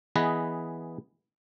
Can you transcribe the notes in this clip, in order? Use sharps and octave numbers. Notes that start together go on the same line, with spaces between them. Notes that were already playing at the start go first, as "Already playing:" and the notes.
E3 B3 G#4 B4 D#5